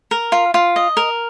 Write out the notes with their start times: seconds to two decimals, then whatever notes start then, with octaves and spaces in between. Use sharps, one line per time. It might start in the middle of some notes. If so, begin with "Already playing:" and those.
0.11 A#4
0.32 F4
0.54 F4
0.76 D#5
0.97 A#4